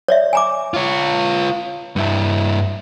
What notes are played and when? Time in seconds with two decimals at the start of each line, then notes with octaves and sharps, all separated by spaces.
0.08 C#5 D5 E5
0.33 G#5 A#5 D6
0.74 F4 C#5
1.96 G2 E4